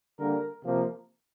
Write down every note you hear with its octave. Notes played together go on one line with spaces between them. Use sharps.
D3 G3 A#3 A#4
C3 F3 A#3